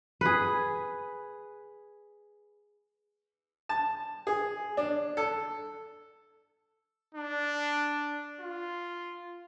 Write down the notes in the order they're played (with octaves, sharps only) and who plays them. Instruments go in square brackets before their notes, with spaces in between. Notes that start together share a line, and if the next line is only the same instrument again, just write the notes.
[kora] G#4 B4
[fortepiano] A5
G#4
D4
A4
[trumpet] D4
F4